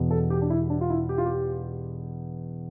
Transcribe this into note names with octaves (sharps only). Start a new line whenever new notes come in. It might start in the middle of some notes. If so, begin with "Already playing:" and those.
Already playing: E1 E2 B2
A4
G4
D4
E4
D4
F4
E4
G4
F4
G4